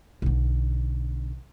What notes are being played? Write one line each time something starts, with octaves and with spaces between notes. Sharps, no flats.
B1 D3